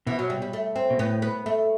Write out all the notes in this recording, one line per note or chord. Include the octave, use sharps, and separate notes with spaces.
B2 E3
F#3
G3
G3
A3
C4
B2
A2 B3
B3
A3